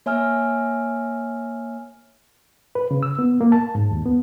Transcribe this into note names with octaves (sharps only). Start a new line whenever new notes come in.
A#3 C#5 E5 G#5 E6 F6
B4
C#3
E6
B3
A#3
A5
G#2
D#2
B3